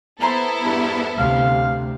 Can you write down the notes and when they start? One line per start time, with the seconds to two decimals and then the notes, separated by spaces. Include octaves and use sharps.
0.21 B3 E4 A4 C5 A#5 C6
0.63 E2 G2
1.18 D2 C3 F5